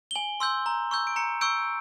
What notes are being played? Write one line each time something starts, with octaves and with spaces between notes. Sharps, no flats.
G7
G#5 F#7
C6 E6 G6
A#5
C#6 E6 G6
D7
A#5 C#7
C#6 E6 G6 D7